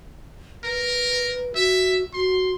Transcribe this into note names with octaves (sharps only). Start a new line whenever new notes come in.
A#4 B4
F#4 E5
F#4 C6